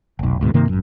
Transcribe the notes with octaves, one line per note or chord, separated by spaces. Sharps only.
F1 B1
D2 G#2 B2
G2 C3 D#3 A#3
G#1 F#2